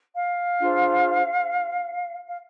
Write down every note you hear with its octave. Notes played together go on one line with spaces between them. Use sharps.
F5
D4 F4 G#4 C5
F5